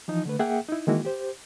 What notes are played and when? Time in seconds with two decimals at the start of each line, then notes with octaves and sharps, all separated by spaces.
0.08 E3 F3 D#4
0.25 D3 A3 B4
0.39 A#3 G#4 E5 F#5 G5
0.68 D#4 E4
0.87 D#3 E3 G#3 A#3 E4 F#4
1.05 G4 C5